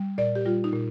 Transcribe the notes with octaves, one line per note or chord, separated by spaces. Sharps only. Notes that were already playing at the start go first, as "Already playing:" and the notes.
Already playing: G3
A#2 D5
G4
G3 F4
D#4
A#2